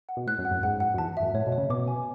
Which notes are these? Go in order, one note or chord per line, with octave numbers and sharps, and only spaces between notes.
F#5
B2
A2 F#6
F#2
F#5
F#2
G#2 F#5
F#5
F#2
E2 A5
E5
F#2
A2 C#5
B2
C#5
C#3
B2 D6
G#5